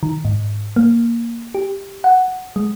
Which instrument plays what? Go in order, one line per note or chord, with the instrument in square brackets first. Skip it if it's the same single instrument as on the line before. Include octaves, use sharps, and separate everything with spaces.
[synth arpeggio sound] D#3
G#2
A#3
G4
F#5
G#3